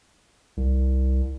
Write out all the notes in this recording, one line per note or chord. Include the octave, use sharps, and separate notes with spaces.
C2